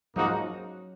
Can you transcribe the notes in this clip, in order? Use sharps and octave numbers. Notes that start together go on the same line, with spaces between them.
G#2 F3 F#3 A#3 D#4 F#4